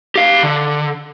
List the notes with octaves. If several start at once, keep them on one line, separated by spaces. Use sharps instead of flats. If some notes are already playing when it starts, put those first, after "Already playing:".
G4 F5
D3